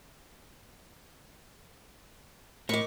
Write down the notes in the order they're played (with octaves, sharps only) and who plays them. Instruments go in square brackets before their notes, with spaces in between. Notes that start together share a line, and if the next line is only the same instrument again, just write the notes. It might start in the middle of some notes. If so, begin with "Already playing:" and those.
[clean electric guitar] A2 [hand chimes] A#4 D#5 [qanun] C#6 D6